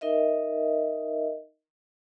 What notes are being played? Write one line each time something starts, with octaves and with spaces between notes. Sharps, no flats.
D#4 A#4 D#5 E5